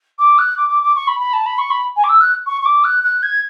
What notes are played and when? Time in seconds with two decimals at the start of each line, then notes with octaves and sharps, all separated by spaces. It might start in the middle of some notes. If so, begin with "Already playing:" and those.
0.19 D6
0.38 F#6
0.57 D6
0.69 D6
0.83 D6
0.95 C#6
1.07 B5
1.20 B5
1.33 A5
1.46 B5
1.58 C#6
1.70 B5
1.96 G#5
2.04 D6
2.09 E6
2.21 F#6
2.46 C#6
2.61 C#6
2.65 D6
2.84 F#6
3.04 F#6
3.23 G#6